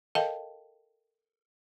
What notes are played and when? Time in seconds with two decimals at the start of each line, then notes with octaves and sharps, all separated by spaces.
0.15 A4 A#4 D#5 F5 G5 A5